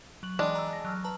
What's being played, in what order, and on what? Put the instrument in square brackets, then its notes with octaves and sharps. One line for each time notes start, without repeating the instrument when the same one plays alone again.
[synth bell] F#3 F#7
[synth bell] E3 G5 [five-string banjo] G#3 D4
[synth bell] A#5 E6
A#6
F#3 E6 F6
B4 A5 A#5